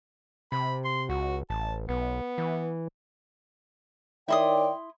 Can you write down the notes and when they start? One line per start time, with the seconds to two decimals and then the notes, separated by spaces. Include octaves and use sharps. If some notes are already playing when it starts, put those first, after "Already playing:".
0.52 C3 B5
0.85 C6
1.09 C#2 F#4
1.50 A1 A5
1.89 B1 B3
2.38 E3
4.28 D#3 E4 C#5 D5 G5 C6 D#6